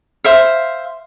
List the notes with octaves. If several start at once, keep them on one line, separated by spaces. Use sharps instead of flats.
C5 E5 F5